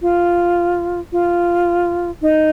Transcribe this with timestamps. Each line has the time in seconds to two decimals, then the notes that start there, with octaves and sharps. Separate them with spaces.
0.02 F4
1.12 F4
2.22 D#4